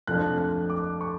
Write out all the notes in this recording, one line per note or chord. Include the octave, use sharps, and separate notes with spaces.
F2 F3 A3 D4 F#6
F#6
D6
C#6